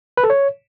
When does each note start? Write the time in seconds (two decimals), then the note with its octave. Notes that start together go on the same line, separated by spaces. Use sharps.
0.17 B4
0.24 A4
0.30 C#5